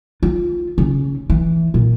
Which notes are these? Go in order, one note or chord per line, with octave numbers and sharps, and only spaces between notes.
F4
C#3
E3
A#2